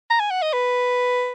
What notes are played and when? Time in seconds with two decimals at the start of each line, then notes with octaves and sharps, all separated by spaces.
0.11 A#5
0.20 G#5
0.30 F#5
0.42 D#5
0.53 B4